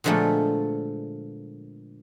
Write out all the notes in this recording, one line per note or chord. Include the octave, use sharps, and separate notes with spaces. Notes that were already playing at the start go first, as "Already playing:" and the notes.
A#2 D3 F3 G#3 A3 B3